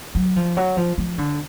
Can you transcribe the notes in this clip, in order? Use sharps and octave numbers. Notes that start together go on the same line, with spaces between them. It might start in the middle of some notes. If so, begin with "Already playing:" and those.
F#3
F3
F#3
F3
F3
D3